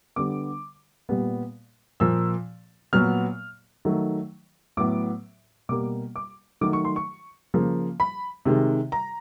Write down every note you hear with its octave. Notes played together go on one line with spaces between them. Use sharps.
D3 G3 B3 D6
A#2 G3 B3
A#2 F3 A#3 E6
A#2 F#3 B3 F6
D#3 F#3 A3
A2 F#3 B3 D6
B2 G3 A#3 D6
D6
D#3 F#3 A3 D6
C#6
C6
C#6
C#3 F3 A#3
B5
C3 D#3 G#3
A#5